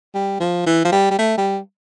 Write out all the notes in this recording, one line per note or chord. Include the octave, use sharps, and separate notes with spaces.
G3
F3
E3
F3
G3
G3
A3
G3